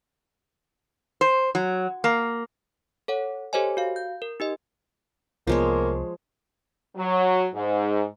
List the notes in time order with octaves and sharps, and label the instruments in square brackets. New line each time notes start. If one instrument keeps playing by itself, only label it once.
[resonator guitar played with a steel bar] C5
F#3
A#3
[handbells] A4 C#5 F#5
G4 A4 C5 C#5 D#5 G#5
F#4 F5
G6
A#4
D#4 G4 D#5
[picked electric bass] C2 B3 [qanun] F3 G#3 C#5 [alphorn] A#3
[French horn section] F#3
G#2